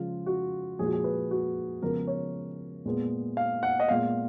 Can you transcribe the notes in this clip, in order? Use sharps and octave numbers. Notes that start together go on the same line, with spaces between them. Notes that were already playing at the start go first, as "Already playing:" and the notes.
Already playing: C#3 F3 G#3 F4
F#4
A#2 F3 G#3 G#4
F#4
G#4
B4
F#4
C#3 F3 G#3 B3 A#4
C#5
A#2 G#3 B3
F5
F#5
D#5
A#2 G#3 B3 F5